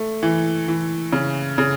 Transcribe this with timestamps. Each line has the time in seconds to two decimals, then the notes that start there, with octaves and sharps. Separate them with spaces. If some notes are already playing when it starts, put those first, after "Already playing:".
Already playing: A3
0.23 E3
0.68 E3
1.13 C#3
1.58 C#3